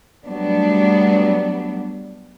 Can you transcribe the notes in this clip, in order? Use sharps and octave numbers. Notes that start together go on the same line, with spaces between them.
F#3 G3 A3 B3 D4